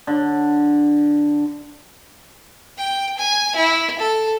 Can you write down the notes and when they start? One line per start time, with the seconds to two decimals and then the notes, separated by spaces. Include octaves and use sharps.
0.07 D3
2.78 G5
3.18 G#5
3.56 E4
3.99 A4